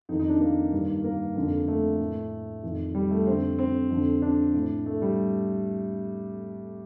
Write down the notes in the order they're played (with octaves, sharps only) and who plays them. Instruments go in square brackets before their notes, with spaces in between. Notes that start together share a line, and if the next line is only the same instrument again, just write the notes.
[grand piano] F2 D#3 D#4
D#4
D4
A#3
G2 D#3
A#3
F2 D3
A3
A2
F2 D#3
G3
A3
F2 D3 C4
C4
F2 D3
D4
A2
A3
G3